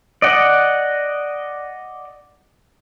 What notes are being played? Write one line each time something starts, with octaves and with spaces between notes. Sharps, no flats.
D5 D#5 F#5